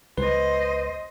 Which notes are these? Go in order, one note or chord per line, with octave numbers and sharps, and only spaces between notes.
C#2 B4 C5 D#5